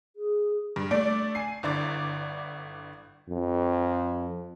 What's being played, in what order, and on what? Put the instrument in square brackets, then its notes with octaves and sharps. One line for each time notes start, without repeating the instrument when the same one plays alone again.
[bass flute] G#4
[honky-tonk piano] G2
A3 D4 D5 D7
G#5 C7
G1 D3 E4 D6 A6
[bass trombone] F2